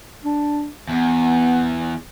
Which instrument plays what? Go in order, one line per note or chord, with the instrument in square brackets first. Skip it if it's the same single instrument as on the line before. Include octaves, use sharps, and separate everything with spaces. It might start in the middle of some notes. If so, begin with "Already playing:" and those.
[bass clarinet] D4
[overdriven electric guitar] E2 [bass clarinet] B3